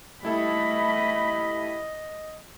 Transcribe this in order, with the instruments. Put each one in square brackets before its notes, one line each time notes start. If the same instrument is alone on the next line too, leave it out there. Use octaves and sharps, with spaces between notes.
[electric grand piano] G3 E4 A4 [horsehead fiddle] A3 B5 [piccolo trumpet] D#5